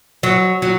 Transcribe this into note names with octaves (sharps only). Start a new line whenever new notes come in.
F#3
F#3